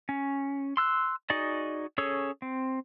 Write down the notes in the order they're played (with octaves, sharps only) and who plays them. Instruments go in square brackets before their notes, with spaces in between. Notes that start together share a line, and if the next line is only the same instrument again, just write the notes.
[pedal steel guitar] C#4
C6 E6 F#6
D#4 F#4 G#4 D5 D#5
C#4 G#4 A4 C#5
C4